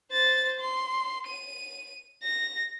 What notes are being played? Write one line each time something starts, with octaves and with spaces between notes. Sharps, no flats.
C5 A6
C6
D#7
A#6